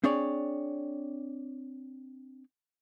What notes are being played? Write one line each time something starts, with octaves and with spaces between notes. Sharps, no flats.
C4 D4 G#4 C#5 D5